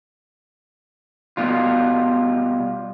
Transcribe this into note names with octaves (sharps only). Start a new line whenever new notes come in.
B2 G3 F4